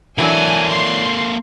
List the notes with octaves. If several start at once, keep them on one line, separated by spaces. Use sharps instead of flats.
E3 F#3 A#3 D4 A4 G#5
C6